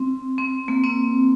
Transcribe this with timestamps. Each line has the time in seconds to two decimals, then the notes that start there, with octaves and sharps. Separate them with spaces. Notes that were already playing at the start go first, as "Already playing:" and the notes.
Already playing: C4
0.38 C4
0.68 A#3
0.84 C4